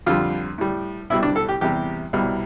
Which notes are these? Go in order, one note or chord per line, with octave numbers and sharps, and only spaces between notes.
F2 D3 G3 F4
A2 G3
C2 B2 G3 E4
D4
A4
G4
E2 C3 G3 G4
C2 B2 G3